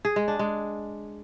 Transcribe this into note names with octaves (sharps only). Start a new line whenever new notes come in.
G#4
G#3
D4
G#3